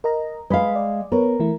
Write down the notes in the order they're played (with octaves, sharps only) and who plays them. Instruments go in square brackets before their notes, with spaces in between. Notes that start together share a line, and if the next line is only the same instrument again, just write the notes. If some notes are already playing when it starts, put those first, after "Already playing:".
[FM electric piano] A#4 D#5 A#5
[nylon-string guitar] G#3 F5 [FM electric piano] B4 B5
[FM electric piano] D5
[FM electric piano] B3 B4 C#5 [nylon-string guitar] A#4
[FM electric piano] E3 A3 E4